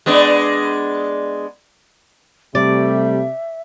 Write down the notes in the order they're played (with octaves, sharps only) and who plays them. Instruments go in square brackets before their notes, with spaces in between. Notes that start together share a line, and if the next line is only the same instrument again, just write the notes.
[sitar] G#3 B3 D4
[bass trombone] C3 [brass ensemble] G3 A3 [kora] D5 [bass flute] E5